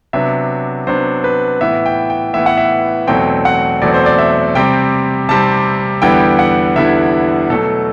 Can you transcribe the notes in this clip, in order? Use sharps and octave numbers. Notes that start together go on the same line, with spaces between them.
C3 F#3 B3 D4 E5
C3 F#3 B3 D4 C5
B4
A2 E3 B3 E5
G5
G5
A2 E3 B3 E5
F#5
E5
E2 B2 F#3 A3 C4 G5
F#5
E2 B2 F#3 A3 C4 D5
C5
D5
E5
C3 G3 C4 G5
C3 G3 C4 A5
E2 D3 G3 B3 E4 G5
F#5
E2 D3 G3 B3 E4 E5
B2 F#3 A3 A4